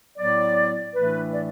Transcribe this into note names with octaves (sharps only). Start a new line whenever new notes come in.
A2 F#3 B3 D5
A2 E3 A3 D4 B4
D5